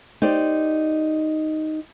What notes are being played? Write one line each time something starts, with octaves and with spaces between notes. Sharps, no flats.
D#4 G4 C5 D5